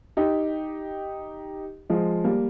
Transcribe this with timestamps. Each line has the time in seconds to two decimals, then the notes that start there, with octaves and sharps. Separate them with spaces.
0.17 D#4 G4
1.90 F3 G#3
2.24 G3 A#3